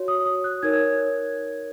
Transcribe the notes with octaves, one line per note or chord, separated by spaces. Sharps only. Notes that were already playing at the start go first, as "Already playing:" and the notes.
Already playing: F#4 C#5
D#6
D#6
F#6
D#4 A#4 C#5 G#6